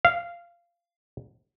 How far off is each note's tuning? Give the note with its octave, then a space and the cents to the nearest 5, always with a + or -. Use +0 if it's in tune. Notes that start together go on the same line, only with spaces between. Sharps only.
F5 -15